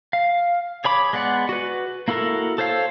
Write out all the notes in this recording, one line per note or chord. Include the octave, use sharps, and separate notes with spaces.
F5
G#4 C#5 B5 D6
G#3 B3 D5 F#5
F#4 B4
A#3 E4 F#4 A4 A#4
A4 C5 C#5 F5